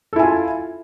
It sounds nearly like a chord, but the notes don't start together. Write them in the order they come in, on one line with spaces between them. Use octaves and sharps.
A4 E4 G#5 F4